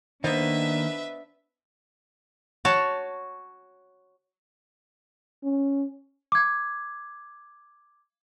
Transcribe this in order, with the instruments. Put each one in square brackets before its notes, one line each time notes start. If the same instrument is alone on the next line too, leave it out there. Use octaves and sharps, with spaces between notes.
[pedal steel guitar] D#3 A#3 [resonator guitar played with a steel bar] B3 C5 D#5 [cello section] D4 [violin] B4 E5
[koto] F#4 C#5 A5
[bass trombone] C#4
[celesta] D6 G#6